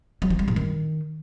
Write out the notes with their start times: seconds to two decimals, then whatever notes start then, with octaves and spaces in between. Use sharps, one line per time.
0.22 F#3
0.30 F3
0.39 G3
0.48 A2
0.56 D#3